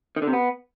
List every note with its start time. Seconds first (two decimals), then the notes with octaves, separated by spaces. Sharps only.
0.16 D#3
0.22 D3
0.27 C3
0.33 B3